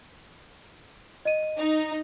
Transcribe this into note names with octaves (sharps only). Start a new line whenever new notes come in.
D#5 D#7
D#4